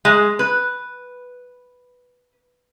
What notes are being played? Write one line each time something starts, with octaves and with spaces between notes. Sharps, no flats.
G#3
B4